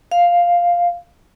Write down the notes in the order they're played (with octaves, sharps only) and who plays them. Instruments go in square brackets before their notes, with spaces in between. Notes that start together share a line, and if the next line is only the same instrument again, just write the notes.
[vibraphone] F5